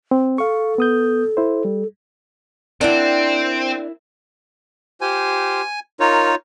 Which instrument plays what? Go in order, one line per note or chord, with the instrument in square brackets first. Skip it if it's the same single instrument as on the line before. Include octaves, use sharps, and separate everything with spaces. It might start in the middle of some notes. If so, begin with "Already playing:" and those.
[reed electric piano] C4
[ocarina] A4 [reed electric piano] F5 C#6
[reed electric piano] B3 D#6 G6
E4 C5
G3
[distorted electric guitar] C4 [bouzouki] D4 D5 F#5 [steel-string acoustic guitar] E4 A#4
[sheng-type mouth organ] F4 G4 C5 [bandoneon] G#5
[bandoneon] D#4 F4 C#5 [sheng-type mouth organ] A#4